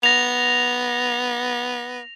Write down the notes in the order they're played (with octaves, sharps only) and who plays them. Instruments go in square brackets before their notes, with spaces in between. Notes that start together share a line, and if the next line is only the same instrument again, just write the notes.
[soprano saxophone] B3 [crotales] A#6 F7